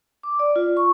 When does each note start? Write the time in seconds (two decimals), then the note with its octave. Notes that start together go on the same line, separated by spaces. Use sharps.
0.23 D6
0.39 D5
0.56 F4
0.77 C#6